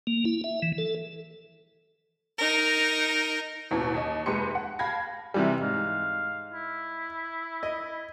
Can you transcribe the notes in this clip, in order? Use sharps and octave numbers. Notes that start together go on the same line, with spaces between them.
A#3
E4
E5
E3
A4
D#4 A#4
A1 D#2 B2 E3
D#2 D#5
F1 G#3 G4 B4 C6 C#7
F#5
F5 G5 A5 B5 G#6 A#6
C3 E3 G3
G#2 F5
E4
D#5